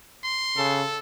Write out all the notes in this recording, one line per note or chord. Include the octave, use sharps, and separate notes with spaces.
C6
C#3 A4